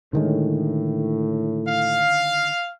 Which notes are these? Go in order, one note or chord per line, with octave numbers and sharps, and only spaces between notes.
A2 D3 D#3 G#3
F5